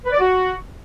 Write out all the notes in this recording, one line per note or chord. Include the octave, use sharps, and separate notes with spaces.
B4
D5
F#4